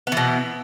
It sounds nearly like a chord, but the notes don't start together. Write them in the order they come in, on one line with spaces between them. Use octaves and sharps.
B3 E3 B2